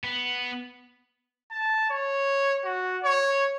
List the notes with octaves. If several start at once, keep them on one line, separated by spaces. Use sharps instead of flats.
B3
A5
C#5
F#4
C#5